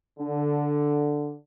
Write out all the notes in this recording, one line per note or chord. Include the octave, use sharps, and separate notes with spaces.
D3